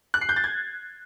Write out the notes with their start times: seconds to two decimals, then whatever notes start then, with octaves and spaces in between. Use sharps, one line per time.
0.14 F#6
0.21 C7
0.29 G6
0.36 A6
0.44 G#6